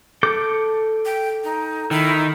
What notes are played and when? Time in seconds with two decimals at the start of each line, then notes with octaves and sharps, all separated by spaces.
0.23 A4 D6 G6
1.06 G5
1.44 D#4
1.91 D#3 E4